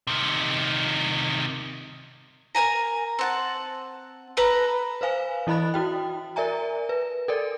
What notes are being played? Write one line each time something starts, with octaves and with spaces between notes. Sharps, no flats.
C3 D#3
A#4 C#5 G#5 A#5
C4 F#5 A5
A4 B4 A#5
B4 C5 F5 G#5
E3 E4 D#5 B5 F#6 A6
E4 F#4 G5
A#4 D5 E5 G#5 A#5
B4
A4 A#4 D5